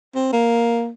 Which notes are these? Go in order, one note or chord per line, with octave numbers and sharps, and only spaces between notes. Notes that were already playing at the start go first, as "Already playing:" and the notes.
C4
A#3